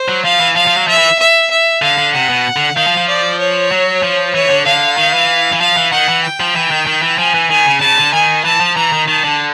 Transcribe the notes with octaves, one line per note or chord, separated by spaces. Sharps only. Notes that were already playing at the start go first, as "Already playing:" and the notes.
Already playing: C5
F#3
F3 F5
E3
F3 F5
F3
F#3
F3 E5
E3
E5
E5
D3 F5
D3
C3 F#5
B2
D3
D#3 F5
F3
F3
D5
C#5
F#3
F3
E3 C#5
D3
D3 F5
D#3
E3
E3
F3 F5
E3
D#3 F#5
E3
G5
F3
E3
D#3
D#3
E3
F3 G#5
E3
D#3 G#5
C#3
C#3 A5
D3
D#3 G#5
E3 A5
F3
E3 A#5
D#3
D#3 A5
D3